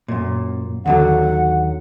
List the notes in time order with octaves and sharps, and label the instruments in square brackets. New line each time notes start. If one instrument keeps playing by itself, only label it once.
[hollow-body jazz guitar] F#2 A#2
[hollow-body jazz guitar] D#2 D3 F#3 [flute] F#5